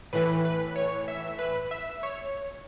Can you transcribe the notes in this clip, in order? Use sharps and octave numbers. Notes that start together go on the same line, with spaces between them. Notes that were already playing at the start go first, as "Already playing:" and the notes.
A2 E3 B4
B4
C#5
E5
B4
E5
C#5